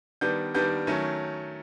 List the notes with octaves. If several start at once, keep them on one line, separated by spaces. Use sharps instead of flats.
D#3 G3 B3 D4 G6
D#3 G3 B3 D4 G6
D#3 F#3 A3 C#4